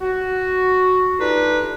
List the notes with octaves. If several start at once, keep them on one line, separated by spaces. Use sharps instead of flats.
F#4
A3 D4 D#4 F4 G4 B4